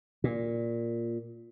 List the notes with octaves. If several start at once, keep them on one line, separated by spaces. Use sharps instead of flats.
A#2